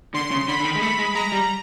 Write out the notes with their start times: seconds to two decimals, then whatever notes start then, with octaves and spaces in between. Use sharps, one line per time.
0.14 D3 C6
0.31 C#3
0.48 D3 B5
0.60 D3
0.65 D#3
0.76 G#3
0.81 A3 B5
0.99 G#3
1.15 G#3 A#5
1.32 G3